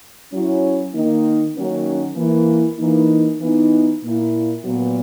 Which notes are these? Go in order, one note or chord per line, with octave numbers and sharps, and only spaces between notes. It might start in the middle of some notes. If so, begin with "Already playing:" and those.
F#3 C#4 E4
D#3 A#3 D#4
D#3 F#3 A#3 C#4
E3 A#3 E4
E3 A#3 D#4
E3 B3 D#4
A#2 A#3 E4
A#2 F#3 B3